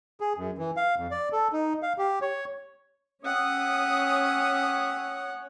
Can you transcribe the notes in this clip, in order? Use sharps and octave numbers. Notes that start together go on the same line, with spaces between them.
G#4
F#2
E3
F5
F2
D5
A4
D#4
F5
G4
C#5
C#4 G4 C#5 E5 F#5 D#6